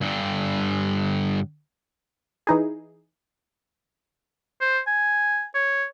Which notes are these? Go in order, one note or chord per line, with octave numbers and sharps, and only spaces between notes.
G2 D3
E3 D#4 G#4
C5
G#5
C#5